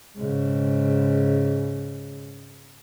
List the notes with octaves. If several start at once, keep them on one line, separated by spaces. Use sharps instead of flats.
G#2 C#3